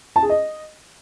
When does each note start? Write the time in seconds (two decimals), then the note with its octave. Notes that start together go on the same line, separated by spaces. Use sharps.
0.16 A5
0.23 G#4
0.29 D#5